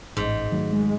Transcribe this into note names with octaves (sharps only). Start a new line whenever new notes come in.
A1 G#2
D#3 F#3 A3
G#3